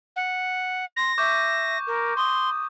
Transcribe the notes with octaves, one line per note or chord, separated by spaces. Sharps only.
F#5
C6 A#6
E5 C#6 D6 G6
A#4
C6 D#6